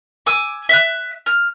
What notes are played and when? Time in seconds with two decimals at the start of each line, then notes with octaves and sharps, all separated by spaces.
0.26 G#5 D6 E6
0.69 E5 F#6
1.26 F6